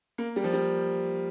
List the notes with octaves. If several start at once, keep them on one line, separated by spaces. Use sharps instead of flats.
A#3
G3
F3
G3